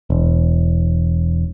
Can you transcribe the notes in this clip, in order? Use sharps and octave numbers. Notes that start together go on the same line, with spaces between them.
E1